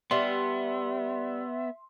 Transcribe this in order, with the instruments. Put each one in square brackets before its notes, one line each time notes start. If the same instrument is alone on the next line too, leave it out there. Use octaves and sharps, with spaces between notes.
[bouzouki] G3 D4 [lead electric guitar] B3 [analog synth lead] E5 [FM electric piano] C6